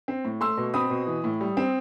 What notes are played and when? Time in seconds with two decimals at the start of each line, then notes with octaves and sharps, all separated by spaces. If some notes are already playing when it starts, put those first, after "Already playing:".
0.08 C4
0.25 A2
0.41 A3 C6 E6
0.57 B2
0.74 C4 B5 D#6
0.90 B2
1.07 E3
1.24 A2
1.41 G3
1.57 C4